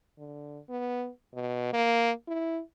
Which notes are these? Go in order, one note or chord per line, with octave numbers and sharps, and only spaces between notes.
D3
B3
B2
A#3
E4